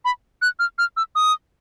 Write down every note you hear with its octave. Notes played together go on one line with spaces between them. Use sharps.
B5
F#6
F6
F6
E6
D#6